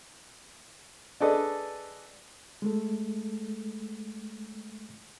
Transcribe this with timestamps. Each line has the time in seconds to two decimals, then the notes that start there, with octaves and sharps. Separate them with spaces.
1.20 D4 G#4 A4 B4 D#5
2.62 G#3 A3 A4